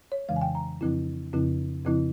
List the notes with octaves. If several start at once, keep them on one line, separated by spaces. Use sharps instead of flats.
C#5
F2 C#3 E3 G#3 F5
G#5
G5
A#5
F2 C#3 F3 C4 E4
F2 C#3 F3 C4 E4
F2 C#3 F3 C4 E4